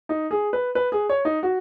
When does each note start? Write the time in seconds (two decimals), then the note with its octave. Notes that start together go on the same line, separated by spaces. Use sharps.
0.09 D#4
0.31 G#4
0.53 B4
0.75 B4
0.92 G#4
1.09 C#5
1.25 D#4
1.43 F#4